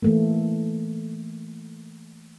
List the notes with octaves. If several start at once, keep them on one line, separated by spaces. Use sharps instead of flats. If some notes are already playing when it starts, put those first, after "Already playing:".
E3 A3 A#3